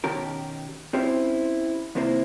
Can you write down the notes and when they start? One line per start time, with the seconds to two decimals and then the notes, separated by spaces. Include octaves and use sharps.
0.04 B2 D#3 C#4 G4 A#4
0.93 C4 C#4 E4 G4 C5
1.95 D#2 C3 A#3 E4 C5